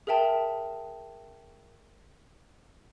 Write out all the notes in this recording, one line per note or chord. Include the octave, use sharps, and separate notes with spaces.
G#4 A#4 E5 G5 A5